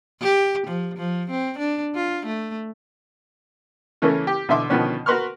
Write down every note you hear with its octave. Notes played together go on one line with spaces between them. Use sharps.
G4
F3
F3
C4
D4
F4
A3
C#3 E3 A3 A#3 C#4
G4
B2 D3 E3 E5 C6 D6
B2 D3 D#3 F3 B3 C#4
F#4 A#4 B4 C6 C#6 F6